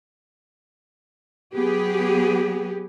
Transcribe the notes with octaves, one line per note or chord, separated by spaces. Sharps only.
F#3 B3 G4 G#4